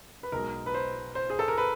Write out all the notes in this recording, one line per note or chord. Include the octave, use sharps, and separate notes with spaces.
B4
B1 B2 G#3 A#4
B4
C5
C5
G#4
A4
A#4
B4